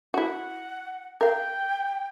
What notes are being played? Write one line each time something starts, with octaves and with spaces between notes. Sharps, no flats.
E4 F#4 F#5
A#4 F5 G5